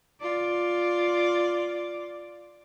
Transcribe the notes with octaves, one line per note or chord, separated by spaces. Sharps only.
F4 D5